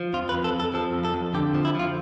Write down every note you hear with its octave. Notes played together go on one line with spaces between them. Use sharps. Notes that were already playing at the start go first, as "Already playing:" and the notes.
Already playing: F3
F2 F4
B4
F2
A4
F2
A4
F3 A4
F2
A4
F2
D3 G4
F3
E4
F3 F4